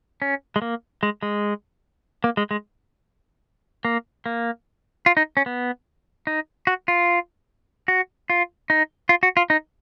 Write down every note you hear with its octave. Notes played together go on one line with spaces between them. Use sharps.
C#4
G#3
A#3
G#3
G#3
A#3
G#3
G#3
A#3
A#3
F4
D#4
C#4
B3
D#4
F#4
F4
F#4
F4
D#4
F4
F#4
F4
D#4